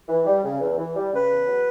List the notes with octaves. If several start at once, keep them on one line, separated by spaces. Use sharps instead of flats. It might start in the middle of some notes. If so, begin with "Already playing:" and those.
E3
G3
C#3
E2
E3
G3
C#3 B4
E2
F#3